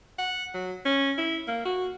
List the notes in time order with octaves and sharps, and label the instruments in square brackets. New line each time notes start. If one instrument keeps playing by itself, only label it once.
[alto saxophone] F#5
F#3
C#4
E4
A#3
F#4